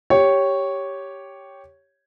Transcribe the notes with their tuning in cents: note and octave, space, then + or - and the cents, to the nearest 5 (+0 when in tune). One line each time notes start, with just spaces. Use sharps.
G4 +0 C#5 +0